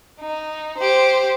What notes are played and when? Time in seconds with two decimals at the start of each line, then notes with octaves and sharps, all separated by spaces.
0.20 D#4
0.78 G4 C5